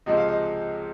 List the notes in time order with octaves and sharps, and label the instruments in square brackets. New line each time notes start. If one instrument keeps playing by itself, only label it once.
[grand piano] C#2 C3 F3 G#3 D#5
F5
D#5